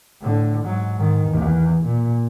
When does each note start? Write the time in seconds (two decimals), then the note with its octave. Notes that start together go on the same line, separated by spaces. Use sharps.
0.21 A2 D3
0.64 G#2 F#3
0.96 G#2 D#3
1.27 E2
1.85 A#2